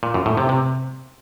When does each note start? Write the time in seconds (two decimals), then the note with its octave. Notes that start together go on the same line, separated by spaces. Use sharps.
0.03 A#2
0.14 F#2
0.26 A2
0.37 C3
0.49 C3